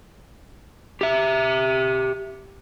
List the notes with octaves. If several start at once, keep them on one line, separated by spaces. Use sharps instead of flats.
G4 E5